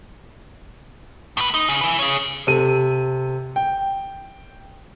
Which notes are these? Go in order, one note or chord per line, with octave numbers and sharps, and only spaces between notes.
A2 B4
D#4
C#3
B4 G#5
G#4 C#5
C3 A4 D#7
G5